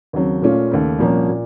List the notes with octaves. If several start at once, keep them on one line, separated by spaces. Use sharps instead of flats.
D#2 C#3 F#3 C4
A#2 A3 C#4 F4
D#2 C#3 A3
C2 A#2 F3 A#3 C#4
A#2